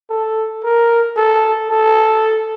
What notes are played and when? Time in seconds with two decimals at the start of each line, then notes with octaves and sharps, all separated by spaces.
0.10 A4
0.64 A#4
1.17 A4
1.70 A4